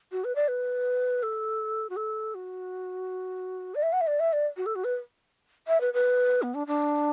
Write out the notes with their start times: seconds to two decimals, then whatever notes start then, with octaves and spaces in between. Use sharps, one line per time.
0.12 F#4
0.24 B4
0.36 D5
0.48 B4
1.23 A4
1.90 F#4
1.96 A4
2.35 F#4
3.75 D5
3.83 E5
3.93 F#5
4.01 E5
4.07 D5
4.20 E5
4.33 D5
4.57 F#4
4.66 A4
4.75 F#4
4.84 B4
5.68 E5
5.81 B4
5.94 B4
6.42 B3
6.55 D4
6.67 D4